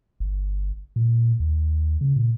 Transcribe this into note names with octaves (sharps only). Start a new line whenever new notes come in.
G1
A#2
D#2
C#3
A#2